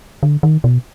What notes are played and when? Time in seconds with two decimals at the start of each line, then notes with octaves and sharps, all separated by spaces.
0.23 D3
0.43 D#3
0.64 B2